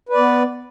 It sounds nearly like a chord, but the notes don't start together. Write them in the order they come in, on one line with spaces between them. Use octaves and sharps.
B4 D5 B3